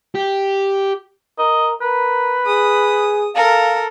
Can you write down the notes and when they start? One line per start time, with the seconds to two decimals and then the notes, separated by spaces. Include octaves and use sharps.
0.15 G4
1.39 A#4 D#5
1.82 A#4 B4
2.47 G#4 D#6
3.35 A4 A#4 F5